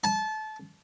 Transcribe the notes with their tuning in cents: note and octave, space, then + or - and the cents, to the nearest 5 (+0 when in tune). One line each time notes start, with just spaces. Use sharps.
A5 -25